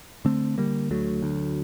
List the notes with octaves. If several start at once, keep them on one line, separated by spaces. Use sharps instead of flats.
D3 A3 C4
D3 G3 A#3
D2 F#3 A3
D2